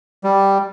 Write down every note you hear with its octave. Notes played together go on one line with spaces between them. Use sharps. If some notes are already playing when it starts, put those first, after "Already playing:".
G3